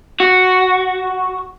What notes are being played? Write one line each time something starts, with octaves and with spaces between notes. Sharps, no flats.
F#4